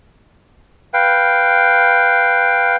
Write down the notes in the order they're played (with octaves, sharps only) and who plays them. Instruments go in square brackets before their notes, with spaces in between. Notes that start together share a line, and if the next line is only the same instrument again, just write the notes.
[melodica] B4 F5 G5